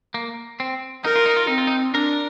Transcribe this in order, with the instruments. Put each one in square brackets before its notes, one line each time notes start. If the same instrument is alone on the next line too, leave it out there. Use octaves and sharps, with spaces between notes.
[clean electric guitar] A#3
C4
[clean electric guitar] D#4 [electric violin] A#4
[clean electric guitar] F4
D#4
F4
[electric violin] C4 [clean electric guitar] D#4
[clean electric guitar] F4
D#4
[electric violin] D4 [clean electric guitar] A#4